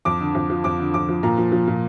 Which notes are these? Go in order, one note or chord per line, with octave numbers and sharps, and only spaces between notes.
F2 D6
D3
F2
F3
F2 D6
D3
F2 D6
F3
A#2 A#5
F3
F3
A#2